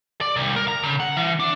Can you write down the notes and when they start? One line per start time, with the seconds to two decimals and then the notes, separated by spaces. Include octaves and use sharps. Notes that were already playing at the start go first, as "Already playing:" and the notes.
0.21 D5
0.36 C2
0.56 A#4
0.68 A#5
0.83 C#3
1.00 F#5
1.17 E3
1.40 D4